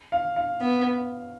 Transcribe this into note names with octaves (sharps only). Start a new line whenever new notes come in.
F5
F5
B3